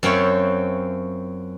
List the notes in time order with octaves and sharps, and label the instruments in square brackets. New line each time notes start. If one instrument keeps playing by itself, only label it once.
[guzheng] F#2 C4 F4 C5 C#5 E5